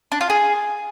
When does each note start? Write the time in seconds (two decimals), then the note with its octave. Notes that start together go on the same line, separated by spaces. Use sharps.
0.12 D4
0.21 F4
0.30 G#4